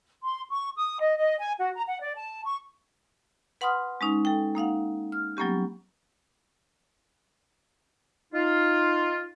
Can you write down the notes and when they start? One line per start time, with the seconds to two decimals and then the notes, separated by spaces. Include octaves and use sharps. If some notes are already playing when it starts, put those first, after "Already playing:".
0.24 C6
0.51 C#6
0.76 D#6
0.99 D#5
1.18 D#5
1.40 G#5
1.59 F#4
1.75 A#5
1.87 F#5
2.01 D5
2.16 A5
2.44 C#6
3.61 B4 F#5 B5 C6 D#6 F6
4.01 G#3 C#4 D#4
4.25 A4 G5
4.55 A#3 D#4 F5 F#5
5.12 F6
5.37 F#3 G3 A#3 B3 C#4 G4
8.34 D#4 F4